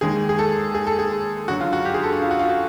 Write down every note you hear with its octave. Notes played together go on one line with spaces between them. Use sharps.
D#2 D#3 G#3 G#4
G#4
A4
G#4
A4
G#4
F#2 D3 F#3 F#4
F4
F#4
G4
G#4
A4
F#4
F4
F#4
F4
F#4